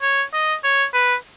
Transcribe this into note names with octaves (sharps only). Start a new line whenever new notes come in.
C#5
D#5
C#5
B4